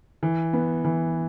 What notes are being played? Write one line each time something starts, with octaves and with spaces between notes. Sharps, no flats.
E3
B3
E3